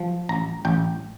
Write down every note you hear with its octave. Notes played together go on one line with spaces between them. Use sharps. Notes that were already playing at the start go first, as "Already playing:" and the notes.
Already playing: F3
A1 A#5
A1 G5